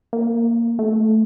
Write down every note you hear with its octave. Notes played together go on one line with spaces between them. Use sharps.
A#3
A3